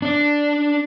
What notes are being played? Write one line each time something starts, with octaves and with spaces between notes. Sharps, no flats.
D4 D5